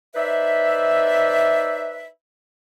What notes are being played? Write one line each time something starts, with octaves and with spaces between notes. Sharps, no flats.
D#4 B4 C5 D5 E5